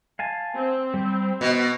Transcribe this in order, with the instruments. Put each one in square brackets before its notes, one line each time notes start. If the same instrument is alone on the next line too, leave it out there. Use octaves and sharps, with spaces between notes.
[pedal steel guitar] F5 G#5 A5
[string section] C4
[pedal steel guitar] G3
[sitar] B2 [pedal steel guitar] B3